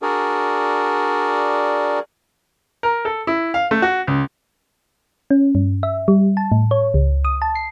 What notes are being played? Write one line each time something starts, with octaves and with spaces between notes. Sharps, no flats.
D4 F#4 G#4 A#4 D5
A#4
A4
E4
F5
A3
F#4
C#2
C#4
G2
E5
G3
A5
A2
C#5
C#2
D#6
A5
C7